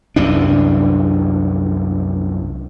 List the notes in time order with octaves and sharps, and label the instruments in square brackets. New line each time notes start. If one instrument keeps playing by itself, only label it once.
[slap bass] C2 F#2 E3 D4